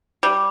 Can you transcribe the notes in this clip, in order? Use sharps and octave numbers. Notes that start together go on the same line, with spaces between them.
G3